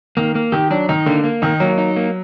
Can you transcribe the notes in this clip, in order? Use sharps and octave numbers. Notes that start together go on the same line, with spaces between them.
D#3 A#3
A#3
D#3 G4
F#3 D4
D#3 D#4
D3 A#3
A#3
D#3 D#4
F#3 A#3
D#4
A#3